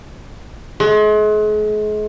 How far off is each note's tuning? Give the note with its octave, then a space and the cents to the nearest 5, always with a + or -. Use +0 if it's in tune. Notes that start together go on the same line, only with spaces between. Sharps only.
G#3 +40